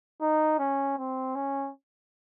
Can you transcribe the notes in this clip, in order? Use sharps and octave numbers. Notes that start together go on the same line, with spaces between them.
D#4
C#4
C4
C#4